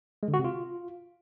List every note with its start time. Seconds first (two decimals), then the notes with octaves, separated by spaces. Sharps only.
0.23 G#3
0.28 D3
0.34 F#4
0.39 C3
0.44 F4